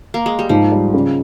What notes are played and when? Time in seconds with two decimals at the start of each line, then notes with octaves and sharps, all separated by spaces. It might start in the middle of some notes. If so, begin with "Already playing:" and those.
0.14 A#3
0.26 G#3
0.39 G3
0.49 G#2 F3
0.72 G3
0.94 C#3